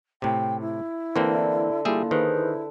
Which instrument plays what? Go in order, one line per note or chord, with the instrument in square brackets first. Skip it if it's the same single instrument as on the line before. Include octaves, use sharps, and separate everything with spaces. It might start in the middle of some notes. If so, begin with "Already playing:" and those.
[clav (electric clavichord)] A2 C3 [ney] G5
[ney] E4
[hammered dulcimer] D3 [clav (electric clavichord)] E3 A#3 C4
[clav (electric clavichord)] G3 G#4 E5 [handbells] A#3 E4 [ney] F4
[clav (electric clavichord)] D#3 [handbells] G#4 B4 C5
[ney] E4